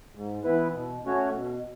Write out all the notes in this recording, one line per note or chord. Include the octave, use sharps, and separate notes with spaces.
G#2
E3 B3 E4 B4
B2
A3 C#4 F#4 C#5
B2